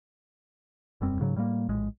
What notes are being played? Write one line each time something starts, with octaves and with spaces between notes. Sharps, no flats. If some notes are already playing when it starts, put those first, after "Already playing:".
E1 F#2 G3 C4
G#2 C#3 F#3
A2 G3 G#3 A#3
A#1 A2 G#3